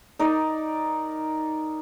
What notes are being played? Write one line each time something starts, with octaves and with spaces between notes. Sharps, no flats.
D#4 A#4 D5